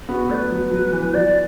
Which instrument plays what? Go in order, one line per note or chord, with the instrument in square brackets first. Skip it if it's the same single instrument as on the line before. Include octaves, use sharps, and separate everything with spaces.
[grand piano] B3 [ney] F#4
[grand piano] A3 [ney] D5
[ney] B4
[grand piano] F#3
F#3
E3
E3
[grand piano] F#3 [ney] D5